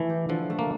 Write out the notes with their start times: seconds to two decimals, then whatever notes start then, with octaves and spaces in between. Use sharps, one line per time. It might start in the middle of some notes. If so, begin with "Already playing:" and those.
Already playing: E3 A3 E4
0.10 G4
0.29 D3 F3
0.50 A3
0.59 A#3